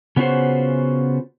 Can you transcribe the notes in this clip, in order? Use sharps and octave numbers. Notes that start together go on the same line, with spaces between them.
C#3 B3 C#4 F4 F#4 C5